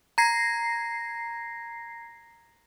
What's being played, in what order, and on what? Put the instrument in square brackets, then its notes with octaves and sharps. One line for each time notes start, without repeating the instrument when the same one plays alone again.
[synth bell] A#5 G#6 A#6 C7